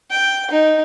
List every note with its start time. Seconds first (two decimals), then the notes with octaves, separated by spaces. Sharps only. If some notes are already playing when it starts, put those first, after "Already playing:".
0.11 G5
0.51 D#4